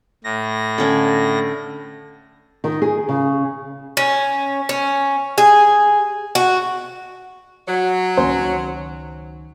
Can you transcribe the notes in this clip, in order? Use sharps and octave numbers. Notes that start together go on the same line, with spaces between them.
A2 A#6
D3 C#4
D#3
G#4
C#3
C#4
C#4
G#4
F#4
F#3
C#2 D#3 C#4 C5 C6